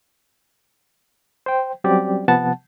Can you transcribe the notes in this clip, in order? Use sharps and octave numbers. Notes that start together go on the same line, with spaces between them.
C5 G5
F#3 G3 C4 C#4 G4 D5
C3 F3 B3 F#5 A5